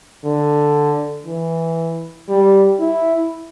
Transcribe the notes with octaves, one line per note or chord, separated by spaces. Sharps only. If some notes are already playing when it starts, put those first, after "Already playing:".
D3
E3
G3
E4